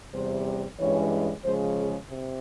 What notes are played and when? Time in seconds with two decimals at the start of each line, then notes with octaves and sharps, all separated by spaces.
0.14 E2 C3 G3 C5
0.80 G2 E3 G#3 C#4 C#5
1.45 C#3 F3 G#3 C5
1.78 G#4
2.10 C3